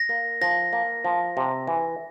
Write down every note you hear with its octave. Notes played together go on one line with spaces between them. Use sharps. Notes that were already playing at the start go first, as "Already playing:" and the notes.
Already playing: A#6
A#3
F3 A#6
A#3
F3
C3
E3